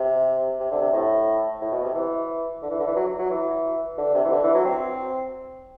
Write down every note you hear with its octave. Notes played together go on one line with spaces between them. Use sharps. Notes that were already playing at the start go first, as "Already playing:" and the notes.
Already playing: C3
C3
D3
C3
A2
A2
B2
C3
E3
D3
E3
D3
E3
F#3
F#3
E3
D3
C3
E3
D3
E3
F#3
C4